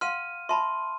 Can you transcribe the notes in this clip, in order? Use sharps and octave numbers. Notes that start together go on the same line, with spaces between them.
F5 F#5 C6 F6 D#7
E5 A5 B5 C6